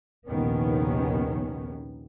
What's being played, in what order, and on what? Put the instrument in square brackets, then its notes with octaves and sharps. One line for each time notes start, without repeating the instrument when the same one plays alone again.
[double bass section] A#1 D#2 C3 D#3 B3 C#4